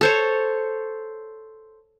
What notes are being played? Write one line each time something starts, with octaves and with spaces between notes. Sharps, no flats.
A4 C5 C#5